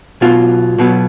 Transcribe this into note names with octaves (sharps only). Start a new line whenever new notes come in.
B1 B2 F#3 F4
B1 B2 F#3